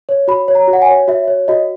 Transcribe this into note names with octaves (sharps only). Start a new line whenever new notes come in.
C#5
F#4 B5
C#5
A#5
F#4
F#5
G#5
C#5
F#4 E5
C#5
F#4 D#5